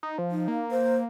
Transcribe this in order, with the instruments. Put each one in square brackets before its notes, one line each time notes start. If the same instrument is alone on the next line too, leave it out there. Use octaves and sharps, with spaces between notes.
[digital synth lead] D#4
F3
[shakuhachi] D#4
[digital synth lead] A#3
[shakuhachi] C5